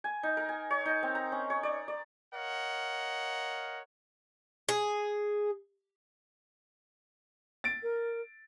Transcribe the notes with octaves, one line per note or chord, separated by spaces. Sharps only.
G#5
D#4
A#4
G#5
C#5
D#4
C4
A#5
C#4
C#5
D5
D5
A#4 C#5 D#5 F5 F#5
G#4
A6 D7
A#4